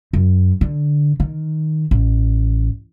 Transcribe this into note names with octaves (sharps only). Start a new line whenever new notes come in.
F#2
D3
D#3
A1